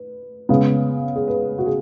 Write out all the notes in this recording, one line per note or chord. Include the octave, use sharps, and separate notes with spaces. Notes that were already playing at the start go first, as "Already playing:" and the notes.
Already playing: B4
C#3 G#3 B3
G#4
B4
F#4
G#4